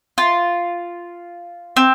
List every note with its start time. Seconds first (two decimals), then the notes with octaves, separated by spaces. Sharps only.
0.18 F4
1.76 C4